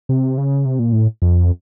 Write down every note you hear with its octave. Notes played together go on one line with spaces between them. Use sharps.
C3
C#3
C3
A#2
A2
F2